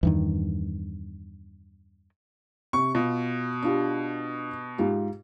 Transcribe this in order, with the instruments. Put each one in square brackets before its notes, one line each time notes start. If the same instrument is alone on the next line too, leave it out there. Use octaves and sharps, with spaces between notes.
[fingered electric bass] E2 G2 D#3
[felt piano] C3 [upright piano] C#6
[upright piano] B2 [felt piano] F4
[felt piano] D4 F4 G4
G#2 F4 G4